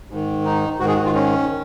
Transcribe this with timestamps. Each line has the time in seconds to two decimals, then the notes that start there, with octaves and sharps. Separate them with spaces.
0.10 G#2 D#3
0.45 D#4
0.79 G#2 F#4
0.84 D#3 G#4
0.97 F#4
1.05 F4
1.14 C#4
1.49 D#3